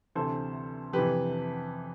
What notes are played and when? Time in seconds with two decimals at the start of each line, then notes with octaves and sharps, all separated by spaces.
0.15 D2 C3 E3 A4 C5
0.93 F2 C3 E3 G4 B4